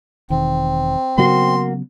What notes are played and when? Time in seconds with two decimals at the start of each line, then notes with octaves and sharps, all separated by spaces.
0.30 E1 D#3 C4
1.18 C#3 F#3 A#3 B3 F#4 C6